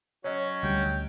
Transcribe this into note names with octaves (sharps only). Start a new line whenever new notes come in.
F#3 C#4 C#5 D#5
D2 G3 G5